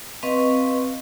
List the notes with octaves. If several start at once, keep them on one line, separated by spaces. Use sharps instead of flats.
C4 B4 D#5 F5 C#6